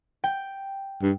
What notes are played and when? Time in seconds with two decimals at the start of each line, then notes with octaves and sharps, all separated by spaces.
0.24 G5
1.02 G2